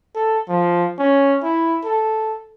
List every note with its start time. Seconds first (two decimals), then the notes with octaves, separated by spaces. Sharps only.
0.15 A4
0.48 F3
0.99 C#4
1.44 E4
1.85 A4